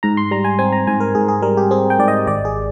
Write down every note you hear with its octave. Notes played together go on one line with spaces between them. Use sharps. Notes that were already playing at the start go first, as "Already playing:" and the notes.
G#2 A#5
C6
G3 A#5
G#5
C4 G#5
A#5
G#2 G#5
A#4
G#2 G#4
G#4
G3 A#4
G4
C4 G#4
G5
G#2 D5
D#5
G#1 D5
G#4